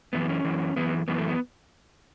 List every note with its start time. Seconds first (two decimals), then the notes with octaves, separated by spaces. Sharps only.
0.13 F#2 E3 B3
0.29 C#4
0.45 F#2 E3
0.76 F#2 E3 B3
1.08 F#2 E3 B3
1.18 A3
1.29 B3